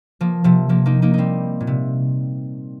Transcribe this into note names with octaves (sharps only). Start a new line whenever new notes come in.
F3 A#3
C3 F3
F3 A#3
A#3 D#4
A#3 D#4
G3 C4 D#4
A#2
C3